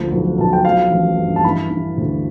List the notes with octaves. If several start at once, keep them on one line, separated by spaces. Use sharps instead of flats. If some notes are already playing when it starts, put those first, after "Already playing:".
Already playing: D2 F3
B1
B1 A5
G5
F3 F5
A1
G2
A5
E3 B5
E3
D2